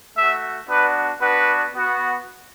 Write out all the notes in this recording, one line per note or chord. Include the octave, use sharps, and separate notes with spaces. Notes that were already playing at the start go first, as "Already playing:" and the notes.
A3 F#4 E5
B3 D4 F#4 B4
B3 D4 F#4 B4
B3 F#4